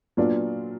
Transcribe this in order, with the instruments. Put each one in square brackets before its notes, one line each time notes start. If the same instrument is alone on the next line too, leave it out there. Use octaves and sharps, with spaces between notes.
[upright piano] A#2 F#3 B3 D4 F4